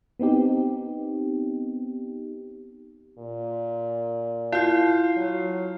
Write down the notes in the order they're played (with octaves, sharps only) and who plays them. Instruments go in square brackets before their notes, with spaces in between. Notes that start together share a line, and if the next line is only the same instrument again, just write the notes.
[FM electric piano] B3 C4 D#4 G4
[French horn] A#2
[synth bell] E4 C7 [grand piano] F4 G6
[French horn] F#3